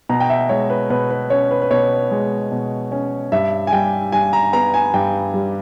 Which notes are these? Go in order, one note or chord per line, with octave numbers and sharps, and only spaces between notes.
B2 A#5
G5
E5
G#3 C#5
B4
B2 B4
B4
C#4 C#5
B4
B4
B2 C#5
G#3
B2
C#4
G2 E5
G#5
G3 G5
G2 G#5
A#5
B3 A#5
G#5
G2 G5
G3